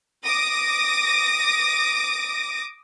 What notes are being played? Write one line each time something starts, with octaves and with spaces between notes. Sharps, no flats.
D6 D#6 A#6